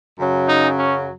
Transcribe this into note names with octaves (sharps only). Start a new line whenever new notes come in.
F#2 C#3 F#3
D#4
C#4